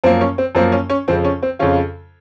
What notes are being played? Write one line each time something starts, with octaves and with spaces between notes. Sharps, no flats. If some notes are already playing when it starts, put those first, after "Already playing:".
F#2 F3 A#3 C4
C#4
C4
F#2 F3 A#3 C4
C#4
C#4
F2 C#3 F3 C4
C#4
C4
F2 C#3 F3 C#4 F4